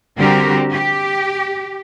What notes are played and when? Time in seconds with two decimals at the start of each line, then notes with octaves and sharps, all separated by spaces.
0.17 D3 G3 C4 F#4 G4 A#4
0.72 G4